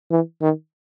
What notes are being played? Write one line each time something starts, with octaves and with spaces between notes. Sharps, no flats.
E3
D#3